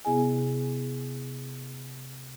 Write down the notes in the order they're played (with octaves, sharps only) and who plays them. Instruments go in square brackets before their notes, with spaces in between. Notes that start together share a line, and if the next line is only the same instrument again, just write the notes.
[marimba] C3 B3 E4 G#4 D#5 G#5